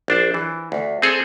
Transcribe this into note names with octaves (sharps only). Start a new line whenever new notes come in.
A#1 D4 C5
E3
D2
C4 G#4 A4